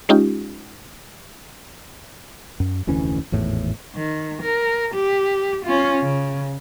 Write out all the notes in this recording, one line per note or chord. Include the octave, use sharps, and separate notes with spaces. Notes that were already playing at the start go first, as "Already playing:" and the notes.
G#3 C#4 D#4 F4 G4
F#2
F1 D2 E3 C#4
G#1 E2 A2
D#3
A#4
G4
C#4 F4
C#3